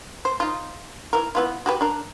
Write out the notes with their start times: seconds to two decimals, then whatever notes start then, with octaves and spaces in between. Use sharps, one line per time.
0.25 C5
0.40 D#4 F4
1.13 E3 A#4
1.35 E3 B3 F4
1.66 F#4 G4 B4
1.81 D4 A#4